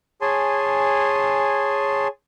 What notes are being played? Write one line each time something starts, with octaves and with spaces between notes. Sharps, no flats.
G#4 C#5 G#5 A5 C6